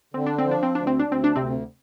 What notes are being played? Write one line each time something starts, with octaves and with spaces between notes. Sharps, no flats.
D3 C4
D4
C4
F3
D4
C4
D2 D4
C4
D4
D2
C4
D4
D2 C3 C4